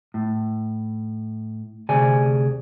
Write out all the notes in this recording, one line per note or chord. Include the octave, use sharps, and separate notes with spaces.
A2
D2 C3 G#4 D5 G#5